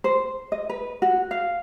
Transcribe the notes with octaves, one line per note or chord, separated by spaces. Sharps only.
C5
D#5
B4
F#4
F5